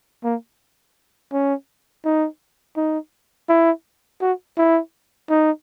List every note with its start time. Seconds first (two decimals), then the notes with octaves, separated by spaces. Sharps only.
0.24 A#3
1.32 C#4
2.05 D#4
2.77 D#4
3.49 E4
4.21 F#4
4.57 E4
5.29 D#4